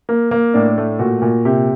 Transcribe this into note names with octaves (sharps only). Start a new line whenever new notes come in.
A#3
A#3
A2 D4
A3
A#2 F#4
A#2
C3 G4